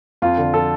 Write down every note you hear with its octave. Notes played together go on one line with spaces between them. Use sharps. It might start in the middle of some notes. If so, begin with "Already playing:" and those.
F2 F4
D3
F3 A4